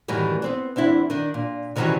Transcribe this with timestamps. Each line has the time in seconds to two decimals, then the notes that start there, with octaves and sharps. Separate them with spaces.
0.08 F#2 A2 D#3 E3 G3
0.42 B3 C4 D4
0.76 E2 C4 D4 E4
1.10 D#3 D4
1.34 A#2
1.76 C3 D#3 E3 F#3 G3 C#4